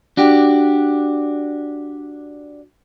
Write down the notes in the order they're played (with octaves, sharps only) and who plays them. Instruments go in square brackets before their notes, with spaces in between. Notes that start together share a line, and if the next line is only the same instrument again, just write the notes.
[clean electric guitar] D4 F#4 G4